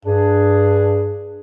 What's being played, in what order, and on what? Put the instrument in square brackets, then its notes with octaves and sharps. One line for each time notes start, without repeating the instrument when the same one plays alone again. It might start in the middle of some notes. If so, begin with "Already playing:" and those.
[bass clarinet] G2 [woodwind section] D4 G#4